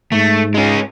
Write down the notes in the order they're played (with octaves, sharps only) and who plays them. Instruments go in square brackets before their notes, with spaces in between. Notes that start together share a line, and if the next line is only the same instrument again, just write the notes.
[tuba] G#2 [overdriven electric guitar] A3
[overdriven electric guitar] G#3 C#4